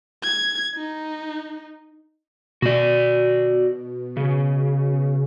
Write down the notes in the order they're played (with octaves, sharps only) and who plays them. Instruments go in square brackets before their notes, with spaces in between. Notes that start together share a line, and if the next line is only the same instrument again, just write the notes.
[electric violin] G#6
D#4
[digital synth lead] B2 [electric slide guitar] F#4 D5
[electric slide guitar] C#3